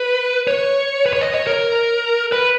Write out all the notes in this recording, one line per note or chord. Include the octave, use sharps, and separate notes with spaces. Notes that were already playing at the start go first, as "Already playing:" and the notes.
Already playing: B4
C#5
B4
C#5
D#5
C#5
A#4
B4